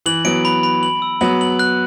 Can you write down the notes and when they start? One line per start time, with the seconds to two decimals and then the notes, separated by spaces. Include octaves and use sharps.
0.06 E3 F#7
0.25 F#3 B3 D7
0.45 B5
0.63 B5
0.83 F#7
1.02 E6
1.21 F#3 B3 F#7
1.41 F#7
1.59 F#6